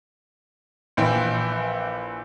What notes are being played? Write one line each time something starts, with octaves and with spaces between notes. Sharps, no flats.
A#1 E3 G5